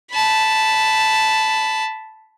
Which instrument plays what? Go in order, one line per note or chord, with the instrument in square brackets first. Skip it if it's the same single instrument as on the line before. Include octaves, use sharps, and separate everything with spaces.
[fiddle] A5 B5